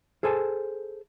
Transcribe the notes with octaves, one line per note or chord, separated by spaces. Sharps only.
G#4 A4 C5 G#5 A5